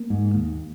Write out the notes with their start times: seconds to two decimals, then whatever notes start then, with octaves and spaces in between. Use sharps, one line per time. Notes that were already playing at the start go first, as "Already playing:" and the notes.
Already playing: A#3
0.10 G#2
0.35 D#2